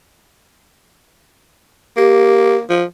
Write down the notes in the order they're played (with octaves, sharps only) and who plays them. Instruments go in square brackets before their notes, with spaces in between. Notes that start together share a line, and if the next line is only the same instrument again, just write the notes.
[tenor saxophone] A#3 [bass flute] G4
[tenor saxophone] F3